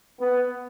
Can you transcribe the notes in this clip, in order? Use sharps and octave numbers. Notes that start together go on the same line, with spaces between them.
B3